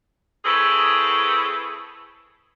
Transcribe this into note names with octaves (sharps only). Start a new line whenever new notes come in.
C4 E4 G#4 A4 B4 C#5